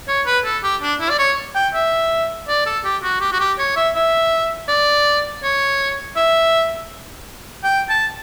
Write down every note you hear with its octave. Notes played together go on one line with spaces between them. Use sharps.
C#5
B4
A4
G4
D4
E4
D5
C#5
G5
E5
D5
A4
G4
F#4
G4
F#4
G4
C#5
E5
E5
D5
C#5
E5
G5
A5